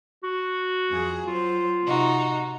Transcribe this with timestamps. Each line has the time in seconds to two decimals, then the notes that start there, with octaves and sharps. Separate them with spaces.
0.23 F#4
0.90 F2 G#4
1.27 F#3 F4 C5
1.84 C3 D#4 F#4